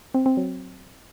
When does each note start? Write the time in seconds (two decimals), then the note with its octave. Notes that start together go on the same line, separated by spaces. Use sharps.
0.14 C4
0.26 C4
0.37 F#3